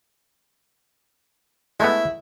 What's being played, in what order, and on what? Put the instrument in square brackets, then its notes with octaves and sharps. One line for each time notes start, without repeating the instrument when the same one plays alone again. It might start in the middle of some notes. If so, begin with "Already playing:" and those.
[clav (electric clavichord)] G#3 A3 B3 [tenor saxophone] E4